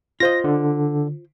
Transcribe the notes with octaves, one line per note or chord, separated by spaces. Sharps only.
F4 C5 D#5 A#6
D3